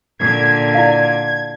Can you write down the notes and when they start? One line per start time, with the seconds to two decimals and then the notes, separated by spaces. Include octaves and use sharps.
0.19 A#2 D3 G#6
0.74 E4 D5 F5